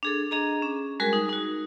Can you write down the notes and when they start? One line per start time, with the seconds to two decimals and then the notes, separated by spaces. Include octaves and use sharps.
0.03 D4 G#4 A4
0.31 D4 G#4 D#5 A#5
0.62 C#4
1.00 G3 G#3 F#4 G#4 A#4
1.13 D#4
1.29 D#4 F#4